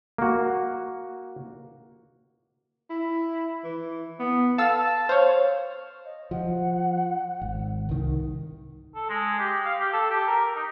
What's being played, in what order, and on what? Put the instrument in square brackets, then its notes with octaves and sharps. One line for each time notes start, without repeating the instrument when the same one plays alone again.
[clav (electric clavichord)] A#3 F#4
[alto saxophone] E4
E3
B3
[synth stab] F5 E6 [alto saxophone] A5
[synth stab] C5 C#5 [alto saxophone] F5
[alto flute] D#5
[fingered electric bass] F3 [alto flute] F#5
[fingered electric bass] G#1
C2 D#3
[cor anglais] A4
G#3
G4
F5
G4
A4
G4
A#4
D#4